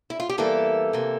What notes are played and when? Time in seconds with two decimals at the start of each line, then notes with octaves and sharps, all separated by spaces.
0.10 E4
0.20 F4
0.29 G4
0.38 E2 E3 G3 A#3 A4
0.93 C3 E3 A#3